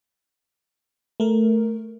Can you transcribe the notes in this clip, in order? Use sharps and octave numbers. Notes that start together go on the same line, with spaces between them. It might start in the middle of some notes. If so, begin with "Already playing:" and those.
A3 A#4